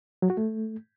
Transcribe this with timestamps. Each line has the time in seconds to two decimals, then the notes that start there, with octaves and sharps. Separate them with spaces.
0.22 F#3
0.30 F#4
0.37 A3